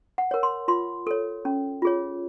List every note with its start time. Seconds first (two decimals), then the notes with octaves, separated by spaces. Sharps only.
0.18 F#5
0.31 A#4 C#5
0.43 C6
0.68 F4 C6
1.07 A4 C#5
1.45 C#4
1.82 F4 G#4 C#5